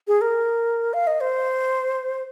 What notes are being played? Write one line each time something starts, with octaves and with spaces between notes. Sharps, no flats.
G#4
A#4
F5
D#5
C5